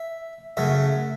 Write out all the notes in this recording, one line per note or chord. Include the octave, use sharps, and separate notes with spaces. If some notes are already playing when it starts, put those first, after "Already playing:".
Already playing: E5
F#2 C#3 F#3 A3 E5